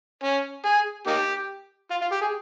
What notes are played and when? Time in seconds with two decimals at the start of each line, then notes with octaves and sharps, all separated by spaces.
0.24 C#4
0.65 G#4
1.07 A#3 D#4 G4
1.91 F4
2.01 F4
2.12 G4
2.21 G#4